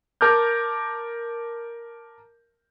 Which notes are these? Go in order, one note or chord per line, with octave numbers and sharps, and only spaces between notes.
A#4 A5 D6 F6 G6